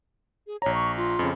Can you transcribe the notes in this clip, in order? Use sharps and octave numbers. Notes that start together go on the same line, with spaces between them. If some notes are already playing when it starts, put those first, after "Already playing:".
G#4
A#1 C#5 A#5
C#6
F4
F2 C#3